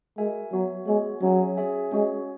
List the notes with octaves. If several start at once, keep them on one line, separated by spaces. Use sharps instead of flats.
G#3 F#4 A#4 E5 G#5
F#3 B3 F#4 C#5 E5
G#3 B3 F#4 C#5 E5
F#3 C#4 G#4 C#5 E5 G#5
C#4 G#4 C#5 E5 G#5
G#3 C#4 F#4 C#5